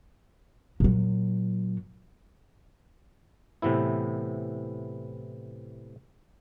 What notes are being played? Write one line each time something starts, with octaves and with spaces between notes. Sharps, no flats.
A#2 F#3
A2 C3 E3 B3 E4